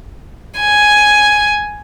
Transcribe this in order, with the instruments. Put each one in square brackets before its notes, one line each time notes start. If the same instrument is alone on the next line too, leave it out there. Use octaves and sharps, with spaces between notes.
[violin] G#5